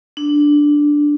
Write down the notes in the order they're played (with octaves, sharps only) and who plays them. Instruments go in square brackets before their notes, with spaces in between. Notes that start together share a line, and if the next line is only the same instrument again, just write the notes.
[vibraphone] D4